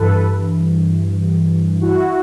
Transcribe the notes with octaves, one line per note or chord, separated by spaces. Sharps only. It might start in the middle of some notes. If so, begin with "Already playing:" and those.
Already playing: G2 E3 A4 B4
E4 F#4